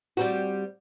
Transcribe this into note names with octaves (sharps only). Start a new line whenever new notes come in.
G3 C4 F#4